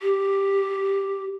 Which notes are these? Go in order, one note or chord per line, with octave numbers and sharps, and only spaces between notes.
G4